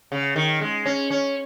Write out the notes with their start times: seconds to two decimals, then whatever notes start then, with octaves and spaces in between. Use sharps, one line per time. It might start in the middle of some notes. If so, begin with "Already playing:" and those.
0.12 C#3
0.36 D#3
0.61 G#3
0.86 C#4
1.11 C#4